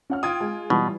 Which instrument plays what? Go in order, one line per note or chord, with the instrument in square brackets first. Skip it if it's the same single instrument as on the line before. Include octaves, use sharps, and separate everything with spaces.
[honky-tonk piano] C#4 F#5 F6
[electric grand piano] F4 D#6 [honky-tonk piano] G5 G#6 D7
[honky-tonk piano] G#3
[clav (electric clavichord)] B2 [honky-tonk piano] E3 G3